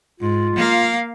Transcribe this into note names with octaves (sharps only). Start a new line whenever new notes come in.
G#2 F4
A#3 F5